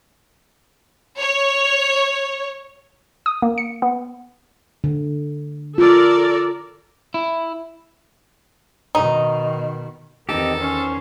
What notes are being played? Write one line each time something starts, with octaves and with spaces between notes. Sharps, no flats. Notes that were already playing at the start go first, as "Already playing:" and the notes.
C#5
D#6
A#3
C#7
B3
D3
F4 A4 A#4 D5
E4
B2 D#3 D#4
E2 D#3 C4 D#4 G4 A4
C#4 C5